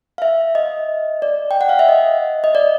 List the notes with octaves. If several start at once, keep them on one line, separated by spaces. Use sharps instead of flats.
F5
E5
D#5
D5
G5
F#5
F5
E5
D#5
D#5
D5